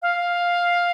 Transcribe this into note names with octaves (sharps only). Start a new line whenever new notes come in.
F5